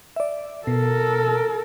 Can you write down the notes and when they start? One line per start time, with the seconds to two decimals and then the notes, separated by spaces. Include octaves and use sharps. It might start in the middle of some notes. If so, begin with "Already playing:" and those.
0.16 D5 E5
0.67 B2 A4 A#4